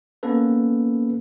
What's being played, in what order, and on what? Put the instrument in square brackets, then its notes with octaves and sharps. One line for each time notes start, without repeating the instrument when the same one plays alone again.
[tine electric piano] A#3 B3 C#4 A4 B4